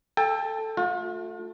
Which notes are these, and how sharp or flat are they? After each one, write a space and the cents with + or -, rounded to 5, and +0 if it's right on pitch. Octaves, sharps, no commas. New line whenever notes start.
A4 +0 G5 +30
A3 +0 F4 +45